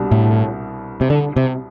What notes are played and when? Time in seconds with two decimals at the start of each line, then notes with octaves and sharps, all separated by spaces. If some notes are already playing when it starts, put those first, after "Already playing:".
Already playing: C2 B2 G3 D4
0.11 A2
1.01 C3
1.10 D3
1.36 C3